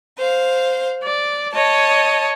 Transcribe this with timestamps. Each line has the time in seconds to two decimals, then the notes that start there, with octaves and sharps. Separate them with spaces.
0.18 C5 F5
1.02 D5
1.54 C#5 D#5 A5